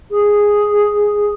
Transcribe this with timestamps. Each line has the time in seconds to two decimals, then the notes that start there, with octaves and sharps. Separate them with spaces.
0.11 G#4